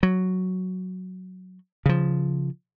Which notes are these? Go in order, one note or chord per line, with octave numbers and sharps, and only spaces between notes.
F#3
C#3 F3